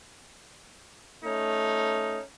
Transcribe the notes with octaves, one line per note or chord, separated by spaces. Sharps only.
A3 C#4 D#4